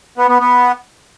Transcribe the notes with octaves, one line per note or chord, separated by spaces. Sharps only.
B3
B3
B3